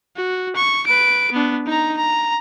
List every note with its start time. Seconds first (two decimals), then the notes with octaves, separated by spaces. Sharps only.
0.17 F#4
0.56 C#6
0.86 B4 D7
1.32 B3 D4
1.66 D#4 A#5
1.97 A#5